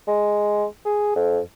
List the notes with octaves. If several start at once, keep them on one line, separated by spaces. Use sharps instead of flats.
G#3
G#4
F2